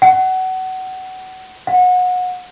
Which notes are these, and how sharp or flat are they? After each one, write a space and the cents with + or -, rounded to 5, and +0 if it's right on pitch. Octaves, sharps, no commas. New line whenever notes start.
F#5 +20
F#5 -30